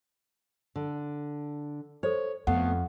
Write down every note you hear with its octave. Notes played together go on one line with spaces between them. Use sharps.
D3
A4 C5 C#5
F2 A3 B3 F5 F#5